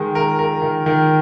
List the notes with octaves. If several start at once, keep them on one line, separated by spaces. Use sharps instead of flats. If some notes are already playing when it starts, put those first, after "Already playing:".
Already playing: D#3 G#3
A#4
A#4
D#3
D#3